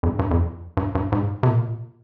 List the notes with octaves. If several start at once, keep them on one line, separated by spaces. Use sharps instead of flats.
F2
G2
G2
F2
G2
G2
G#2
C3
A#2